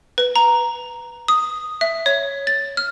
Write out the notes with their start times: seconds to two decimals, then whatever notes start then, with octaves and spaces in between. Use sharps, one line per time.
0.18 B4
0.36 A#5
1.28 D#6
1.81 E5
2.06 C#5
2.47 A6
2.77 F6